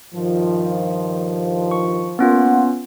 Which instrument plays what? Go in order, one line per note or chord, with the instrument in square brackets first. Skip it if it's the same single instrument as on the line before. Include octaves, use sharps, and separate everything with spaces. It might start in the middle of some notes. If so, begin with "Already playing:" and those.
[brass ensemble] G2 D#3 F3
[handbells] C#6
[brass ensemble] A#3 F#5 [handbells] B3 C#4 F4